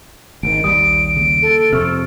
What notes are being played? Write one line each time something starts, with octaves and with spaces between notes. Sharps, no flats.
G#1 D#3 D7
A#1 D#2 G3 D#6
C#3 A#3
A4
F2 C3 C#6 E6 F6